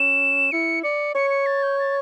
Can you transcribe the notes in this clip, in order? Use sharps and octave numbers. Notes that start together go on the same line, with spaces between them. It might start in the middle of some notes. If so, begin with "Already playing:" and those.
Already playing: C#4 E7
E4 C#7
D5 C#7
C#5 C#7
C#7
A6
G6
A6